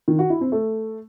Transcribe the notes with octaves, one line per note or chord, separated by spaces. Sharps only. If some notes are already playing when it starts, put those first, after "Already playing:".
D#3
F#4
E4
C4
A3